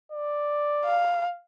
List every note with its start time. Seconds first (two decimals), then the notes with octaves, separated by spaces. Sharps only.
0.12 D5
0.85 F5